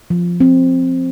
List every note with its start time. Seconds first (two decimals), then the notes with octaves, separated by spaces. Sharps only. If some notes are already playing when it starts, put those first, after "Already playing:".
0.10 F3
0.40 C4